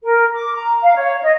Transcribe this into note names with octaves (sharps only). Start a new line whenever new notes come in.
A#4
D6
A#5
F5
C#5
D#5